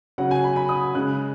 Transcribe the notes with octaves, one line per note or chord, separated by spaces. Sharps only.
C#3 F#3 F#5
G#5
B5
B5
D#6
C#3 G#3 F#6